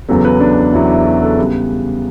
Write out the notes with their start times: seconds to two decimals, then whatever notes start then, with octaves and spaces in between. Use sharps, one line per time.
0.09 E2 C#3 F#3 B3 A4
0.25 B4
0.40 D4
0.73 E2 C#3 F#3 B3 E4
0.90 E4
1.06 F#4
1.22 A4
1.38 C#3 G3 B3 B4